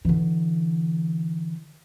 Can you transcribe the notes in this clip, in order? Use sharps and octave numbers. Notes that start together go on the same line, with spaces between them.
D3 E3